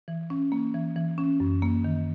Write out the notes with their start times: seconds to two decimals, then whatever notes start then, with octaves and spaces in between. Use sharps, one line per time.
0.08 E3
0.30 C#4
0.52 A#3
0.74 E3
0.96 E3
1.18 C#4
1.40 F#2
1.62 A#3
1.84 D#3